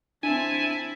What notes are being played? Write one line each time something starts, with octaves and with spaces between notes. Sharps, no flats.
C4 D4 E4 G#5 A5